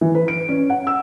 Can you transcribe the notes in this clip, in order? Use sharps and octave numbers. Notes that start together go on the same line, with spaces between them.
E3
B4
D7
C#4
F#5
E6